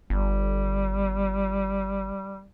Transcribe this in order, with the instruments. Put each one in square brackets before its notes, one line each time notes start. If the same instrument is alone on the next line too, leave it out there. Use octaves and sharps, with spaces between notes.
[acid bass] G1 [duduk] G3